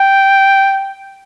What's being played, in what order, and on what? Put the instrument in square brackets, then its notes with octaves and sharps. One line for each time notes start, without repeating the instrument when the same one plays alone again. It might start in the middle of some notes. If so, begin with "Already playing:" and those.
Already playing: [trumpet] G5